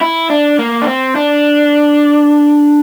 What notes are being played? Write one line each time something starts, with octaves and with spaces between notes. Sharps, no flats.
E4
D4
A#3
D4
C4
D4